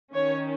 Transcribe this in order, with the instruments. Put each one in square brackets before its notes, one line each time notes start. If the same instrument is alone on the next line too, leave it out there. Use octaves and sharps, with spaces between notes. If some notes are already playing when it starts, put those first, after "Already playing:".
[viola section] D#3 C#4 C#5